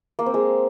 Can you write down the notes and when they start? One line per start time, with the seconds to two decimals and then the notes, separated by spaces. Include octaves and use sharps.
0.19 A#3
0.26 C4
0.34 G#3